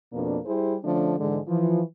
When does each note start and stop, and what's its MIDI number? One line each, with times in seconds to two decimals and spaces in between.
0.13 0.38 41
0.13 0.38 47
0.13 0.38 58
0.13 0.38 62
0.46 0.75 55
0.46 0.75 64
0.46 0.75 67
0.46 0.75 68
0.46 0.75 72
0.83 1.15 50
0.83 1.15 53
0.83 1.15 57
0.83 1.15 61
0.83 1.15 62
1.18 1.39 44
1.18 1.39 50
1.18 1.39 52
1.18 1.39 56
1.47 1.80 52
1.47 1.80 53